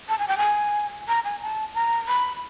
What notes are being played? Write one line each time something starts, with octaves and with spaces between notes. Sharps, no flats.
A5
G#5
G5
G#5
A#5
G#5
A5
A#5
B5